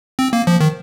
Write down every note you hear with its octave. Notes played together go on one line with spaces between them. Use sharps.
C4
A#3
F3
D#3